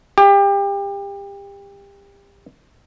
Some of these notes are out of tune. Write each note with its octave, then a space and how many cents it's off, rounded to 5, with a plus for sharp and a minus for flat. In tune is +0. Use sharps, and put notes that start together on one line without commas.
G4 +30